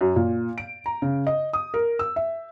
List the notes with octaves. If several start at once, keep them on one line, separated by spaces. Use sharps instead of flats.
F#2
A#2
D7
A#5
C#3
D#5
D#6
A#4
E6
E5